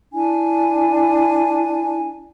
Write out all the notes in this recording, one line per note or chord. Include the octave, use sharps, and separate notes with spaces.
D4 E4 G#5